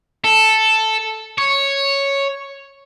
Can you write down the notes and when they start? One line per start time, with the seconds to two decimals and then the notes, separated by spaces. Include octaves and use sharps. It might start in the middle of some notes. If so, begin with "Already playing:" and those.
0.24 A4
1.38 C#5